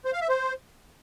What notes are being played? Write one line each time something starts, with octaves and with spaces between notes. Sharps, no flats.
C5
F5
E5
C5